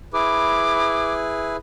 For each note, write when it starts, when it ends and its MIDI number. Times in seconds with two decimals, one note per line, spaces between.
0.13 1.56 64
0.13 1.56 68
0.13 1.56 71
0.13 1.14 86